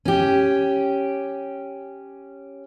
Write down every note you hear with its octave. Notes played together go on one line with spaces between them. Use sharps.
C#4 G4